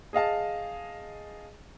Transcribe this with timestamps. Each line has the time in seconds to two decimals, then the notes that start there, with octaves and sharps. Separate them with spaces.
0.13 G#4 D#5 F5 A5